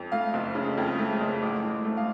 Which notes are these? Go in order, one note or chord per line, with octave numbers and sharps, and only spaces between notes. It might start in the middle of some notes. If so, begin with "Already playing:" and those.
Already playing: F2
A3 F5
F#1
C#3
F2
A3
F#1
A1
A1
A3
F5